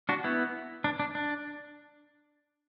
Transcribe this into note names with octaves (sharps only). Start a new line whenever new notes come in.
D4 F#4
B3 E4
D4
D4
D4